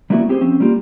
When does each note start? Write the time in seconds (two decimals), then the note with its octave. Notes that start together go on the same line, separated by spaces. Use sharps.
0.10 G3 A#3 B3 E4 F#4
0.29 C4 G4 G#4 C5
0.41 F3 C4 C#4
0.60 G3 A#3 F4 G4